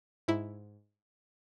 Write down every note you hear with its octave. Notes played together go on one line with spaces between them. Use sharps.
G#2 E4